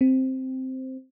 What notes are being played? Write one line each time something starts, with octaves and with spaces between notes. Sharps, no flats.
C4